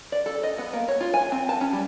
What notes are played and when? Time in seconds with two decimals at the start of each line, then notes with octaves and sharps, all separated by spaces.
0.12 D5
0.26 A4
0.43 D#5
0.58 B3
0.73 A#3
0.88 C#5
1.01 F4
1.14 G#5
1.32 C4
1.49 A5
1.61 C#4
1.73 G3